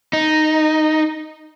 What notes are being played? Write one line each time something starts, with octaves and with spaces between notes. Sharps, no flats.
D#4